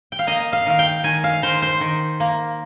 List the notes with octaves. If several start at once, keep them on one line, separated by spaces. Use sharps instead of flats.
G5
F5
A#3 D#5
F5
D#3 F5
G5
D#3 G#5
F5
D#3 C5
C5
D#3
A#3